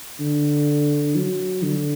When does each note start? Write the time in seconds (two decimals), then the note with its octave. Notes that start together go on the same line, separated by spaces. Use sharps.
0.20 D3
1.16 F#3
1.63 D3